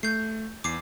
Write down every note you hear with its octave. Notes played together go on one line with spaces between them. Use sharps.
A3 G6 C7
E2 D6 C7